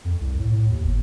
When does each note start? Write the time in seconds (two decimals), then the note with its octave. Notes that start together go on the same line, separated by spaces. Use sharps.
0.05 F2
0.20 C2
0.39 A2
0.52 A2
0.70 D#2
0.84 G1